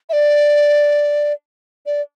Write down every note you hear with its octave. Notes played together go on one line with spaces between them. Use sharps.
E5
D5
D5